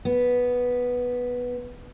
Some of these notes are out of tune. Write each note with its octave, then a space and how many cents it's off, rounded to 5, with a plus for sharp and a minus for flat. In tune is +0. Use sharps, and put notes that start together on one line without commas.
B3 -5